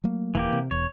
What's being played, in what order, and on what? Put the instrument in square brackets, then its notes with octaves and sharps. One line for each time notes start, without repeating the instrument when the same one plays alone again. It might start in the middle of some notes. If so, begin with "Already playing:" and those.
[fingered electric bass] F#3 A3 A#3
[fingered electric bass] D#1 [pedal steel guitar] E3 A#3 G4
[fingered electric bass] C3
[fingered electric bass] E1 E2 [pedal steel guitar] C#5